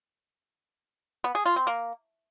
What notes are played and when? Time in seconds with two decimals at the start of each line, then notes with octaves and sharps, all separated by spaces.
1.24 B3
1.35 G#4
1.46 F4
1.56 C4
1.67 A#3